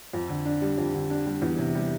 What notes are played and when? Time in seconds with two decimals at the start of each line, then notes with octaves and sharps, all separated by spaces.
0.13 F2
0.29 D3
0.45 D4
0.62 G3
0.78 F2
0.94 D3
1.10 D4
1.26 G3
1.42 E2
1.59 C3
1.75 G3